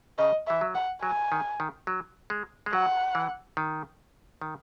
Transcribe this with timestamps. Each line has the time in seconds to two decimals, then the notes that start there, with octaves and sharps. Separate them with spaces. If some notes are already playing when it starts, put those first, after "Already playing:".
0.18 C#3 D#5
0.47 E3 E5
0.61 F#3
0.75 F#5
1.03 F#3 G#5
1.32 D#3
1.60 D#3
1.87 F#3
2.30 G#3
2.66 G#3
2.72 F#3 F#5
3.15 E3
3.57 D#3
4.41 D#3